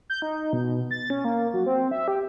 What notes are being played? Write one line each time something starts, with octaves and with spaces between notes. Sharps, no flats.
G6
D#4
B2
A6
C#4
A#3
F#3
C4
E5
G4